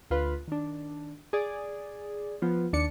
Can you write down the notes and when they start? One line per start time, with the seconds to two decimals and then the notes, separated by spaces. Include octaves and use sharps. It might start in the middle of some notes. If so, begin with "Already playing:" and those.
0.10 D2 F4 B4
0.48 D#3 D4
1.33 G#4 D5
2.42 F3 B3 F4
2.73 D#2 D4 D5 C#7